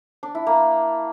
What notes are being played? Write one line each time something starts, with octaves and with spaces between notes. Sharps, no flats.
D4
E4
A#3